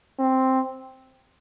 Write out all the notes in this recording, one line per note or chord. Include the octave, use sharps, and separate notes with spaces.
C4